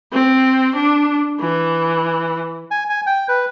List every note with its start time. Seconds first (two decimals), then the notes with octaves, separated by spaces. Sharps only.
0.12 C4
0.75 D4
1.40 E3
2.71 G#5
2.90 G#5
3.06 G5
3.28 B4